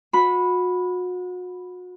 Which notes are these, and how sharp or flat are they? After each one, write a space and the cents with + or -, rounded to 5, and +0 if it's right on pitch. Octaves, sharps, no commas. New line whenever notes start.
F#4 -35 B5 +0